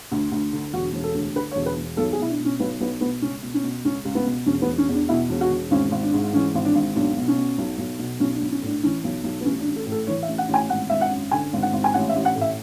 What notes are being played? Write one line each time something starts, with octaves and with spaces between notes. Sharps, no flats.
D2
D2
D3
E1 F#4
E1
A4
D2
D3 B4
C#5
E1
B4
E1
B1 A4
G#4
B2 E4
D4
B2
C#4
B1 B3
B1 B3
B2 B3
C#2 C#4
B2
C#4
B2
C#2 C#4
C#2
B3
B2
E1 C#4
B3
E1
C#4
E2 D4
B2 E4
E1
F#4
E1
G#1 C#4
G#1
D4
G#2
E3 C#4
G#1
D4
G#1
B1 D4
B2
C#4
B2
B1
B1
B2
B1 C#4
D4
B1
C#4
A2 D4
E3 C#4
B1
B1
B3
A1 C#4
D4
A1
A4
A2
A4
E3 C#5
E5
A1
F#5
A1
G#5
G#1 F#5
G#1 E5
F#5
F#2
D3 G#5
G#1
F#5
G#1
G#5
A1 F#5
E5
A1
F#5
A2
E5